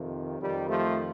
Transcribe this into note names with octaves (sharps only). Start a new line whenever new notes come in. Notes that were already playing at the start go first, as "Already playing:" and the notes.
Already playing: F2 C3 D#3
F2 D#3 G3
F3 A3